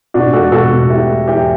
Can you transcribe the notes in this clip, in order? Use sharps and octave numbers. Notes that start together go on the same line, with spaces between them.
B2 D4 F#4
E1 F#4 A4
B2 F#4 A4
B2
A3 E4 G4
A3
E2 E4 G4